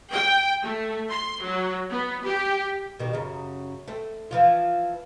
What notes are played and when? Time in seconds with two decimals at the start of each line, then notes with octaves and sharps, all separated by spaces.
0.12 G5
0.63 A3
1.10 C6
1.42 F#3
1.90 B3
2.24 G4
2.99 B2 D#3 G3
3.13 F#2 C#3
3.88 A3 C4
4.31 E3 F3 F4